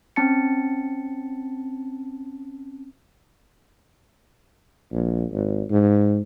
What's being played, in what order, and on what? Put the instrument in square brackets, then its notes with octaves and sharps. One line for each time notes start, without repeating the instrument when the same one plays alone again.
[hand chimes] C4 C#4 A5 A6 C#7
[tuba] A#1
G#1
G#2